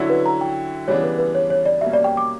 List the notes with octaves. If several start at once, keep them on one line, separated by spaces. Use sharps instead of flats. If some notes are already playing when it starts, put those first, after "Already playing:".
Already playing: D3 F#3 C#4 E4
B4
A#5
G5
C#3 E3 G3 B3 D4 C#5
B4
B4
C#5
C#5
D5
B2 G3 A#3 C#4 E5
D5
G5
D6